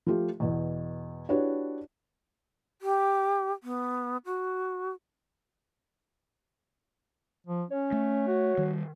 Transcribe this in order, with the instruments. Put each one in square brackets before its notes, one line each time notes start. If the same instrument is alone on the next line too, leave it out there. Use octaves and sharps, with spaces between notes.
[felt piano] F3 A3 F4 G4
E2 B2
D4 E4 F#4 G4 B4 C#5
[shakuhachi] G4
B3
F#4
[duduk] F3
[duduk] C#4 [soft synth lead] C#5
[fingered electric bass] A3
[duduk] F#4
[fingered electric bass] D#3 G3